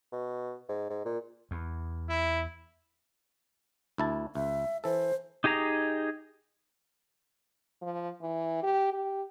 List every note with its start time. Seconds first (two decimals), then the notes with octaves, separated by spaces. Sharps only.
0.12 B2
0.69 G#2
0.90 G#2
1.05 A#2
1.51 E2
2.09 E4
3.98 D2 E4 A5
4.35 C#2 E5
4.84 E3 A4 C5
5.44 D#4 G4 G#4 D#5 A#5
7.82 F3
8.22 E3
8.62 G4
8.92 G4